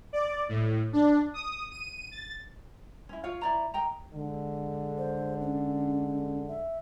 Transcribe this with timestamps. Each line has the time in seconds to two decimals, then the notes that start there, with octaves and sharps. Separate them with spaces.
0.13 D5
0.49 A2
0.93 D4
1.34 D#6
1.71 D#7
2.11 A6
3.09 C#4 E4
3.24 F4 C#5 F5
3.42 E4 D5 A#5
3.74 D#5 G5 A#5
4.13 D3 G#3
4.98 C5
5.41 C#4
6.48 E5